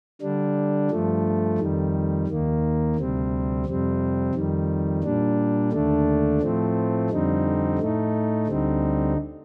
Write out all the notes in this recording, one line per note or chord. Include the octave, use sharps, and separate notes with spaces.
D3 G3 D4
G2 F3 A3
F2 D#3 G3
D#2 D#3 A#3
D2 C3 G3 C4
F2 C3 G3 C4
F2 D#3 G3
A#2 G3 D4
D#2 D3 A3 D4
A2 F3 A3 C4
F2 D3 G3 C4 D#4
A2 A3 D#4
D2 D3 G3 C4 D#4